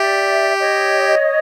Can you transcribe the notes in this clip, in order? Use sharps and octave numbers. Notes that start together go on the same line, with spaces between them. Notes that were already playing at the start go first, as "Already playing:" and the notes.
Already playing: G4 D5 E5
C#5 D#5